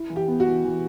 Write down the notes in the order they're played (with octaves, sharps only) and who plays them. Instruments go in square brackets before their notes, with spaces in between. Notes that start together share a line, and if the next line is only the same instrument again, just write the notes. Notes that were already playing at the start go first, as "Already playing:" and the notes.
Already playing: [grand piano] E4
E3
[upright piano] G4
[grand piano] B3
[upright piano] F#4
[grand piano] E3
E3